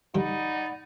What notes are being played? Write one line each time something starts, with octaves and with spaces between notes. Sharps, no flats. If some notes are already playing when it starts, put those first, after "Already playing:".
G2 D3 G3 D#4 D5 F#5 B5